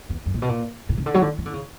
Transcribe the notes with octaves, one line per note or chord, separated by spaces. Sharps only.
E2
F#2
A#2
B2
A#2
A#2
C#3
D3
F#3
D3
E3
D3
C#3